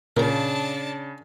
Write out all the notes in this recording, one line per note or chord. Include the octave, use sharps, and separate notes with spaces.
A#2 C#3 D4 A#4 A5 A#5